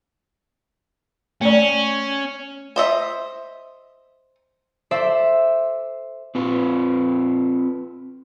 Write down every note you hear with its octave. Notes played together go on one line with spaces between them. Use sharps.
A3 C#4 D5
C5 D#5 E5
A4 C5 D5 E5
C4 F4 B4